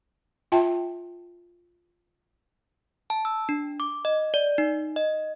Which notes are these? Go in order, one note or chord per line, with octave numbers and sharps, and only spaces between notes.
F4 E5 G5 A5
A5
E6
D4
D6
D#5
D5
D#4
D#5